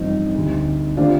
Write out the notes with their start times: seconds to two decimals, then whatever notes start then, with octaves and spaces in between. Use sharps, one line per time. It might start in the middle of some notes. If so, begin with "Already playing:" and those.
Already playing: A1 G2 F3 C4 D#4
0.35 D2 D3 G3
0.97 D3 A3 C4 D4 F4 G4